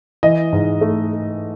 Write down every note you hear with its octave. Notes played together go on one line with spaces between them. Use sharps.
E3 D#5
G#2
A3